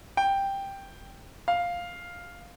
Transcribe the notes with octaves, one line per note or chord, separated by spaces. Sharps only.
G5
F5